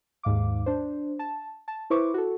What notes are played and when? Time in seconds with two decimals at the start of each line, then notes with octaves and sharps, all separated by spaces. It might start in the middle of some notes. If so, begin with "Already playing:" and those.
0.23 D#2 G#2 F5 D6
0.66 D4 C5
1.19 A5
1.68 A5
1.90 E4 B4 C5 C#6 D6
2.14 F#4 A4